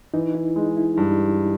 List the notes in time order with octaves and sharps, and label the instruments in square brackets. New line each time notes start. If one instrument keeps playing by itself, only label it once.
[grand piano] E3 [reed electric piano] D#4
[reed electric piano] E4
[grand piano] G#3 [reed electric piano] D#4
[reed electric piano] E4
[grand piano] G2